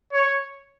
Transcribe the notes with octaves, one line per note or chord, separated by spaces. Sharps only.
C#5